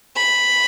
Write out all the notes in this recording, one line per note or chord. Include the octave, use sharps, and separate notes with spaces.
B5